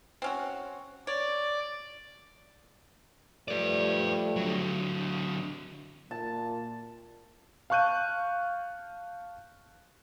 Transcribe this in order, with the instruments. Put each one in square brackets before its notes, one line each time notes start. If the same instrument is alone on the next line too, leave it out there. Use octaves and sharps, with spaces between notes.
[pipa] C4 C#4 F#4
[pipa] C#5 [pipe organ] D5
[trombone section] F3 G3 A3 [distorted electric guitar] B4 D5
[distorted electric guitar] D3 F#3
[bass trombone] A#2 [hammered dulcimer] A5
[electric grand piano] F5 A5 C#6 F#6 G6 D#7